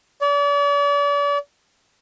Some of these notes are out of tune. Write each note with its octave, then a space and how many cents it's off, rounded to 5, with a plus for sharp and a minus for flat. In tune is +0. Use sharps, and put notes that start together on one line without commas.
D5 -40